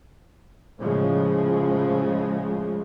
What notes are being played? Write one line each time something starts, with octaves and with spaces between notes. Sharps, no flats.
A2 C#3 F3 G#3